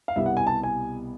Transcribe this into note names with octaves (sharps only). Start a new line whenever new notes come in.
F5
C2 B2 G3 B3 E5
F#5
G#5
A5
G#5